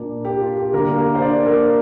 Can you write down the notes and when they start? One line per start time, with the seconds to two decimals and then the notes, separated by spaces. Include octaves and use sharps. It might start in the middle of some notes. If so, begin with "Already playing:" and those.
Already playing: A#2 A#3 D4
0.25 G4
0.40 F4
0.57 G4
0.73 D2 D3 G3 A#3 D4 A#4
0.97 A#3 A#4
1.15 C5
1.22 D4 D5
1.46 A#3 A#4